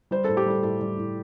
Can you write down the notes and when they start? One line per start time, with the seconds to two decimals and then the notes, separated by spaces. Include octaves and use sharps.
0.11 G3 C5
0.24 A2 A4
0.37 G4
0.46 G3 A4
0.63 A2 A4
0.80 G3
0.98 A2